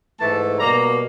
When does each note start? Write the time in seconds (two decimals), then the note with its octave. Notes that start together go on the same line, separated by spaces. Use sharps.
0.20 G#2 E3 A3 A5
0.59 B2 G3 A#3 A#5